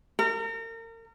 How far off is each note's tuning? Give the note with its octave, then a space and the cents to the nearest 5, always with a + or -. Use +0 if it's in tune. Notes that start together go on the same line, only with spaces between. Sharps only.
A#4 -35